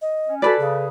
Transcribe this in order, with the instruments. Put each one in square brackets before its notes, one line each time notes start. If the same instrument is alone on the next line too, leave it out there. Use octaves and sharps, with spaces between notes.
[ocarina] D#5
[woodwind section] C#4
[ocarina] F#4 [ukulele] A4 B4 D5 [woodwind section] G#5 A5 B5
[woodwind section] C#3 [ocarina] G#4